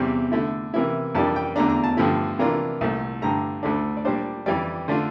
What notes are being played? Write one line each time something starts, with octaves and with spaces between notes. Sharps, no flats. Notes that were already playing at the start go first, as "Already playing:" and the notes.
Already playing: E2 C3 G3 C4 G5
D3 A3 E4
C3 E3 A#3 E4
F2 E3 G3 A#3 D4 A5
G5
E2 D3 A3 D4 A#5
A#5
A5
G2 D3 F3 A3 E4
C3 E3 A#3 D4 F4 A#5
C2 A#2 A3
G2 D3 A3 A#5
D2 D3 A3 D4
D5
A#2 G3 D4 C5
F2 E3 G3 D5
D3 A3 D4 F4